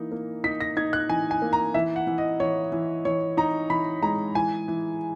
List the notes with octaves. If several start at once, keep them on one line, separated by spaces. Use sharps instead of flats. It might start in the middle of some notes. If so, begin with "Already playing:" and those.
Already playing: E3 A#3 D#4
A#3
D#4 B6
A#6
D#4 G#6
F#6
E3 G#5
G#5
A#3
A#5
E3 E5
F#5
E3
D#5
E3 C#5
E3
E3 C#5
D#4 A#5
E3 B5
G#3 A#5
E3 G#5
E3